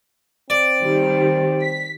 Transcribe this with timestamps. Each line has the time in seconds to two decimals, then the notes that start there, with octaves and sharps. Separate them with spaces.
0.50 C4 D5
0.83 D#3 G3
1.61 B6